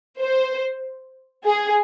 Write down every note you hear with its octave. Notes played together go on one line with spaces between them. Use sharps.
C5
G#4